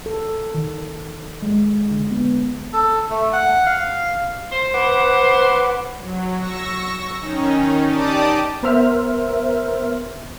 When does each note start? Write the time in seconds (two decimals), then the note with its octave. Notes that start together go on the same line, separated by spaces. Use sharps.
0.06 A4
0.54 D#3
1.42 G#3
1.91 D3
2.11 B3
2.73 A4
3.10 A3
3.33 F#5
3.66 F5
4.52 C5
4.74 B4 F#5 D6
6.00 F#3
6.38 C#6 E6 A#6
7.20 D#3 C#4 D#4
7.86 D#4 G4 D5 A5 D6 D#6
8.63 B3 A#4 C5 E5 F6